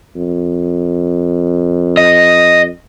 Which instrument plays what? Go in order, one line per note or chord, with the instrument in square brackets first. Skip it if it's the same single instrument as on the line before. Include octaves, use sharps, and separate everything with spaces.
[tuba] F2
[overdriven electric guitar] D#5